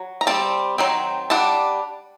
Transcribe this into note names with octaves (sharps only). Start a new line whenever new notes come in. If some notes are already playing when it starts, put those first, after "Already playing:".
Already playing: F#3
A#5
G3 C4 A5
D#3 F#3 C4
G3 D4 F#5 A5